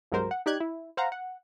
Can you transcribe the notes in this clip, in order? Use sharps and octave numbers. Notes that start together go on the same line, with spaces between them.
C2 G2 F#3 G#3 A#4 C5
F#5
D#4 G4 D5 F#6 G#6
E4
C5 F5 F#5 A#5
F#5